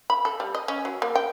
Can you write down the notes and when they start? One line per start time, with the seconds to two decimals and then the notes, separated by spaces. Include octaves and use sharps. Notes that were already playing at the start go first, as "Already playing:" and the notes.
0.10 B5
0.25 A4
0.40 G3
0.55 D#5
0.68 C#4
0.85 F#3
1.02 A#3
1.15 G5